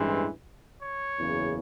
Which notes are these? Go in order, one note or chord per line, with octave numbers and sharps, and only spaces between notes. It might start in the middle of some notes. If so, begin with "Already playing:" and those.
Already playing: A1 G2 E3 G#3 C4
C#5
F#1 E2 C#3